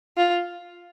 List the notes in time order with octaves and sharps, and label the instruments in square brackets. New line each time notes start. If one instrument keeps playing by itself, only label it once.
[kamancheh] F4